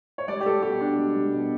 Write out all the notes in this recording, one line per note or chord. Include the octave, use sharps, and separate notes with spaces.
C#5
G3 D5
G4
G3 A4
B2 G4
B2 D4
G3
G3
B2